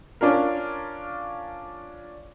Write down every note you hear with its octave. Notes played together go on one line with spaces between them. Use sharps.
C#4 D4 F4 A#4